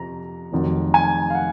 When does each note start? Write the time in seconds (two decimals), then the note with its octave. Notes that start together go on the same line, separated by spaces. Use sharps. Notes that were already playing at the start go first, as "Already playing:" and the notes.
Already playing: F2 C3 F3 A#5
0.52 F1 F2 D#3 F#3
0.94 G#5
1.30 F5
1.35 F#5